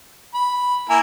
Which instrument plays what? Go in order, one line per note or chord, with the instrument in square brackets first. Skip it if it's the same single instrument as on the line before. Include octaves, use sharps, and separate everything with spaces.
[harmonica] B5
[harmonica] A#3 E4 A#4 [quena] G#5